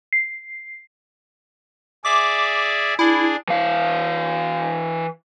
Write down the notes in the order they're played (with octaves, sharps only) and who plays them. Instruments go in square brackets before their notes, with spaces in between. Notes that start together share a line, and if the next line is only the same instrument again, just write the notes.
[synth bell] C7
[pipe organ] G#4 D5 E5 [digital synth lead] D6
[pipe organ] D4 G#4 [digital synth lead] E4
[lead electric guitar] E3 F5